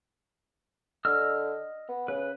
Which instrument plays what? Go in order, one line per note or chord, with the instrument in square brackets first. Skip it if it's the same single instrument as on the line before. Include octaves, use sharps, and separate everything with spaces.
[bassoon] D3 [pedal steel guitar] D#5 E6 F6
[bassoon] B3
[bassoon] C#3 [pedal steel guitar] B4